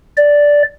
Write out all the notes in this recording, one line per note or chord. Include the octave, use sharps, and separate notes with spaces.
D5